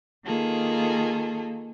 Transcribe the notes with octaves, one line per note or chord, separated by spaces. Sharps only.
D#3 A#3 F4 G#4 A4